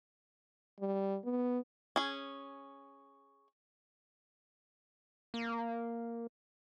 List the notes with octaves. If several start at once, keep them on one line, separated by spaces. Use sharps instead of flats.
G3
B3
C#4 G#4
A#3